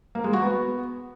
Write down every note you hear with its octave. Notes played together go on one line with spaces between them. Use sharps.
A#3
G#3
F#4
B3